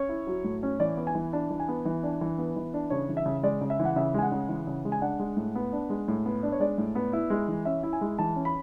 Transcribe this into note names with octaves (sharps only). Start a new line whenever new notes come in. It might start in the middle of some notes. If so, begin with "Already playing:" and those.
Already playing: C#4 C#5
E4
F#3
A2
C#4
E3 D5
B3
G#5
E3
D4 A5
E3
G#5
B3
E3
D4
E3
B3
E3
D4
C#3 C#5
E3
E5
C#3
G#3 D5
C#3
E5
E3
F#5
C#3 E5
G#3 G#5
F#5
C#3
E3
C#3
G#3
G#5
D4 F#5
G#3
A2
B3
D4
G#3
A2
B3
D4
C#5
G#3 D5
A2
B3
E4
G#3
E3
C#4 E5
E4
G#5
G#3
E3 A5
C#4
B5